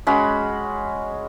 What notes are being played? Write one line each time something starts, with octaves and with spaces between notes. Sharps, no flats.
G#3 C#4 F#4 B5